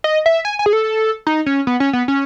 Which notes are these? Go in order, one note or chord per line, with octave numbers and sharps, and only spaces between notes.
D#5
E5
G#5
G#5
G#4
A4
D#4
C#4
B3
C#4
B3
C#4